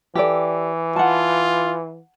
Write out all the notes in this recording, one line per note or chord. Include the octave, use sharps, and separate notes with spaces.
E3 G4 A4 D5
F4 F#5 A5